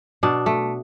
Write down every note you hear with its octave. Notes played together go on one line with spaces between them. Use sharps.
B2 D4
A3